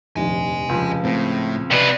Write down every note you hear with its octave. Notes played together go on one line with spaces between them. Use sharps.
F1 A#1 D#2 D#5 G#5
C#2 F3
A2 C4
C3 B4 D5